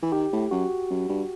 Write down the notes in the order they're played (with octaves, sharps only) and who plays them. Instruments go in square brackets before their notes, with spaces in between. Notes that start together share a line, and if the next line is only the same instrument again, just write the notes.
[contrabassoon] E3
[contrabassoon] D#3 [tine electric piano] G4
[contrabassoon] A2
[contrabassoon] F#2 [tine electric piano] F#4
[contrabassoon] F#2
G2